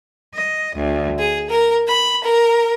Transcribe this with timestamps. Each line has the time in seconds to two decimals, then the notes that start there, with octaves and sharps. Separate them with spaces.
0.34 D#5
0.77 D2
1.19 G#4
1.49 A#4
1.87 B5
2.24 A#4